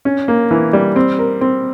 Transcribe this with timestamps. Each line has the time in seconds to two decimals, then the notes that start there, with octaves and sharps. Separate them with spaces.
0.05 C#4
0.28 A#3
0.51 E3
0.73 G3
0.96 C4
1.19 A#4
1.41 C4